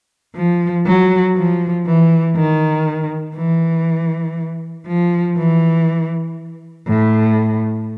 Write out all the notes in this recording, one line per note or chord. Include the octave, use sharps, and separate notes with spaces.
F3
F#3
F3
E3
D#3
E3
F3
E3
A2